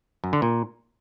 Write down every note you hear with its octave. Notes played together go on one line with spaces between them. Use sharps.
F#2
D3
A#2